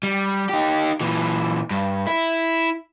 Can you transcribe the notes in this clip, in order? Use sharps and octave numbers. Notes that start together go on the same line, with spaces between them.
G3
D#4 G4
A#2 E3
G2
E4